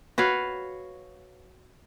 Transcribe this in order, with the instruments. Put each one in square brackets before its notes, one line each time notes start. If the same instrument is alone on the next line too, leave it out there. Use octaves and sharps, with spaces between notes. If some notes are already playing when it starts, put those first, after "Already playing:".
[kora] F#4 B4 C#5 F5